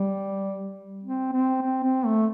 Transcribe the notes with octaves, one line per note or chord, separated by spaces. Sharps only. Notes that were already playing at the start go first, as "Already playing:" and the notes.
Already playing: G3
C4
C4
C4
C4
A3